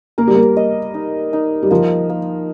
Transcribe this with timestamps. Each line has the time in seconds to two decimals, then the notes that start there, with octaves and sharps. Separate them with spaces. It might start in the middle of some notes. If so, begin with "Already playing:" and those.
0.18 A#3 A#4
0.27 G3
0.36 A#3
0.57 D#5
0.94 D#4
1.33 D#4
1.63 G3
1.71 F3 A#3
2.09 A#3